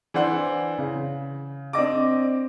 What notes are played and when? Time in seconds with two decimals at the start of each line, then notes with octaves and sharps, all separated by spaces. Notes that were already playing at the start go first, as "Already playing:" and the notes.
0.14 E3 D4 C5 F#5
0.78 C#3
1.73 C4 D4 D#5 D6